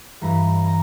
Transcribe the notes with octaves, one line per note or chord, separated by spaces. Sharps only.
G2 E3 G3 A#5
A#5